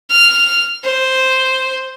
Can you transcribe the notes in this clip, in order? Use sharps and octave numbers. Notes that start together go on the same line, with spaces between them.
F6
C5